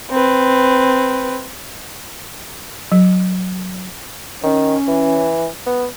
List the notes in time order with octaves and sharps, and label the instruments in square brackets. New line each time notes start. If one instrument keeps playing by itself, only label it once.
[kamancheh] C4 B4
[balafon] F#3
[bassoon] D#3 [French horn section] C#4
[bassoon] E3
B3